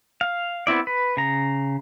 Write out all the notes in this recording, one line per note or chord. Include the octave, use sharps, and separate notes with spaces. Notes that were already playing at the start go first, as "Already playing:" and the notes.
F5
B3 C4 E4 D5
B4
C#3 A#5